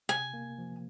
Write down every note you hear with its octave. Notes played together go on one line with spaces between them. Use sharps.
C3 G#5
A#3
F3